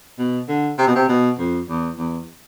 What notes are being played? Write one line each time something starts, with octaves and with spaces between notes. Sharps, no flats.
B2
D3
C3
B2
C3
B2
F2
E2
E2